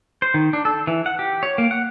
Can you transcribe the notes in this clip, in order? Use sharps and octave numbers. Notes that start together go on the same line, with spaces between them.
C5
D#3
D4
A4
E3
F#5
G4
C#5
A#3
F#5